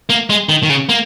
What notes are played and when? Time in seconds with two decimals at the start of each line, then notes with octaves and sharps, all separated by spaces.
0.10 A#3
0.30 G#3
0.49 D#3
0.63 D#3
0.69 C#3
0.89 A#3